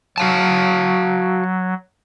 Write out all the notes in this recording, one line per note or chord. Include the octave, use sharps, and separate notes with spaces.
F#3 F#4 F5 A5